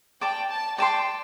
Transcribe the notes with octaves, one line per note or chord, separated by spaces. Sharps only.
D5 G5 A5 D6
A5
D5 G5 A5 C6